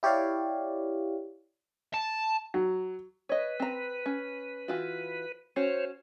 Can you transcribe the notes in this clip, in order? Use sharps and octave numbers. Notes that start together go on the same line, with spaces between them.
E4 G4 C#5 D5 F5
A5
F#3
B4 C#5 D#5
C4 A#5
C#4
E3 F4 F#4
C#4 F#4 C5 C#5